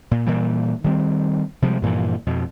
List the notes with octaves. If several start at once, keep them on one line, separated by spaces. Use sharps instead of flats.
A#2
A#2 E3 G3
D#3 G3 C4
C3 F3 G3 G#3
G2 A#2 E3 F3
F2 B2